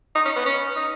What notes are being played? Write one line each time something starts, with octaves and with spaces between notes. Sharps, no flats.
D#4
C#4
B3
C#4
D#4